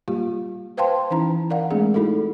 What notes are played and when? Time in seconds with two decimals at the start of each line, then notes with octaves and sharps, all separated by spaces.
0.08 G3 A#3 F4 G4
0.77 B4 C5 F5 G5 A5 C6
1.11 E3 C#4 D#4 E4 A#5
1.50 A#4 D5 F5 F#5
1.71 G#3 A3 C4 D4 G#4
1.94 A3 D#4 E4 F#4 A4